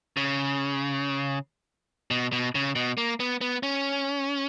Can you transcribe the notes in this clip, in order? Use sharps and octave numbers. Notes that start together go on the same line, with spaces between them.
C#3
B2
B2
C#3
B2
A#3
B3
B3
C#4